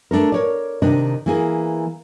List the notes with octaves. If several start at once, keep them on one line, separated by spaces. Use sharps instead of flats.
A3 D4 A4 A#4
A#4 C#5 D5
C3 D#3 D4 D#5
E3 A#3 G#4